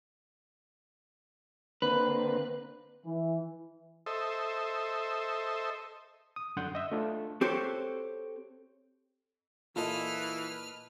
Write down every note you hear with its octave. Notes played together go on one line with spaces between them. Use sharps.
D3 A#3 C4 B4
E3
A4 C5 D#5 E5
D#6
F#2 D3 F#5 C6 G6
D#5 E5
A3 D4 F4
C4 F#4 G4 A4 C5 C#5
A#2 E3 F4 A4 B4 D#5 F6